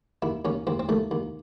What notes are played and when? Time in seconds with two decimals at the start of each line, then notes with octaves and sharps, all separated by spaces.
0.22 D#2 E4
0.45 D#2 C#4
0.67 D#2 C4
0.79 C4
0.89 D#2 A3
1.11 D#2